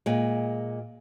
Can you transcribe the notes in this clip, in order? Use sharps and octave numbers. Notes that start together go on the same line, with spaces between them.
A#2 G#3